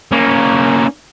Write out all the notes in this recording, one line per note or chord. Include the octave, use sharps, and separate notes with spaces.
A#3 C#4